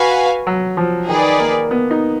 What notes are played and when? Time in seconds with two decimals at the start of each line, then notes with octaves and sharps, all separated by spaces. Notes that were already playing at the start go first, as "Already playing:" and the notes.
Already playing: F#4 B4 F5 G#5
0.47 F#3
0.77 F3
1.09 D#3 D#4 G#4 B4 D5
1.39 A#3
1.71 B3
1.91 D#4